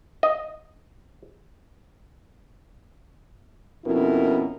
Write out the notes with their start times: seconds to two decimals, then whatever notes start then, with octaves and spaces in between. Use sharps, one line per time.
0.23 D#5
3.85 F2 B2 C#4 E4 A#4